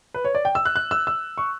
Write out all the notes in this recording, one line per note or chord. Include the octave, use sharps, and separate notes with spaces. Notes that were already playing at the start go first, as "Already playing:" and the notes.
B4
C#5
D5
G5
E6
F#6
F#6
E6
E6
C#6